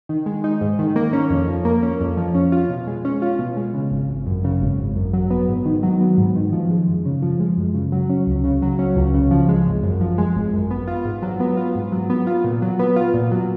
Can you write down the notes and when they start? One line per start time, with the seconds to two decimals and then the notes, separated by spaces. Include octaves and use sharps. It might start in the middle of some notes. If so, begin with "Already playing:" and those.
0.09 D#3
0.26 G#3
0.44 D#4
0.61 G#2
0.79 D#3
0.96 A#3
1.13 C#4
1.30 F2
1.48 F3
1.65 A#3
1.83 C#4
2.00 F2
2.17 F3
2.34 C#4
2.52 F4
2.69 B2
2.87 G#3
3.05 C#4
3.22 F4
3.39 B2
3.57 G#3
3.74 C#3
3.91 G#1
4.09 G#1
4.26 F#2
4.44 C#3
4.61 G#1
4.79 G#1
4.96 F#2
5.13 F#3
5.30 B3
5.49 G#2
5.65 D#3
5.83 F#3
6.00 B3
6.18 G#2
6.36 D#3
6.53 F3
6.70 G#3
6.88 F#2
7.05 C#3
7.22 F3
7.40 G#3
7.57 F#2
7.74 C#3
7.92 F#3
8.10 C#4
8.27 C#2
8.44 C#3
8.62 F#3
8.79 C#4
8.96 C#2
9.14 C#3
9.31 F3
9.49 G#3
9.66 G#1
9.83 F#2
10.01 F3
10.18 G#3
10.35 G#1
10.53 F#2
10.70 B3
10.87 F4
11.05 G#2
11.22 F#3
11.40 B3
11.57 F4
11.75 G#2
11.92 F#3
12.10 B3
12.27 F4
12.44 A#2
12.62 F#3
12.79 B3
12.96 F4
13.14 A#2
13.31 F#3